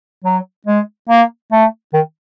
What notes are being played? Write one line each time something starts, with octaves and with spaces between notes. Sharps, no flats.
F#3
G#3
A#3
A3
D#3